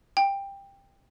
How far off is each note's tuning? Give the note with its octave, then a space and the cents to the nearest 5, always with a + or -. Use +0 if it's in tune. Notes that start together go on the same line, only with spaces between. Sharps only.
G5 +15